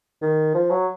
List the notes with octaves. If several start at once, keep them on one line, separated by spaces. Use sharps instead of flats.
D#3
F3
F#3